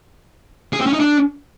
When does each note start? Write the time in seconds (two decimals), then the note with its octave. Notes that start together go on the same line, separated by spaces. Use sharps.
0.73 G#4
0.80 C4
0.86 C#4
0.93 D#4
1.00 D4